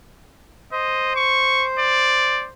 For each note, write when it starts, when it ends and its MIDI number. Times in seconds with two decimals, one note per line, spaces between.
0.72 2.51 72
0.72 1.12 75
1.16 1.66 85
1.79 2.46 74